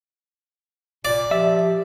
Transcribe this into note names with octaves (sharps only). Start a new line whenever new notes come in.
A#2 D5
F3 G4 E5